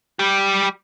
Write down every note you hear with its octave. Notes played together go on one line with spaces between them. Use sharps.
G3 G4